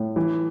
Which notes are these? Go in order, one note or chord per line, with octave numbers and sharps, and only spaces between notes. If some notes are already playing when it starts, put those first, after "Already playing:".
Already playing: A2
E3